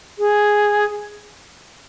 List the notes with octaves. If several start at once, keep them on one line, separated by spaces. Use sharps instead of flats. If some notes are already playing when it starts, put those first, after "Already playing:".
G#4